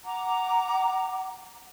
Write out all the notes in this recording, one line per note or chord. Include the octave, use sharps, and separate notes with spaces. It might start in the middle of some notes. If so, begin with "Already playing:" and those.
F#5 A#5 D6